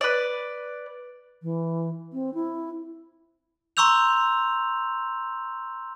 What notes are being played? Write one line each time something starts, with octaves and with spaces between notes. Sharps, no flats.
B4 D5
E3
C4
E4
A#5 C6 C#6 E6 G6 F7